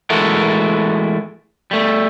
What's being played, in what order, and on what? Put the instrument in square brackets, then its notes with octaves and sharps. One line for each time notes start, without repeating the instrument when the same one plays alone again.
[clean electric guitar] E3 G#3 A3 F#4 A4 A#4
G3 A3